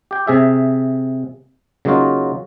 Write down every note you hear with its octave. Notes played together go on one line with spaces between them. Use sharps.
G4 G5
C3 G#4 E5
C#3 F#3 A#3 D#4 F4 F#4